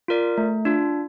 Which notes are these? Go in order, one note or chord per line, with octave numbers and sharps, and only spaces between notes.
F4 A#4 D5
A3
D4 F4